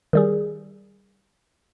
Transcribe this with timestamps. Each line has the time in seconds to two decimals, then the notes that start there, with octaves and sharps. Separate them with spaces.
0.13 D#3 G3 G#4